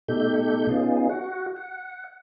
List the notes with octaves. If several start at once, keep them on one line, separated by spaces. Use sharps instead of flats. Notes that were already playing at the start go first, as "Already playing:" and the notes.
B2 A3 D#4 G4 A4 G6
B3 C#4 D#4 F4 G#4
F#4 F#5
F#5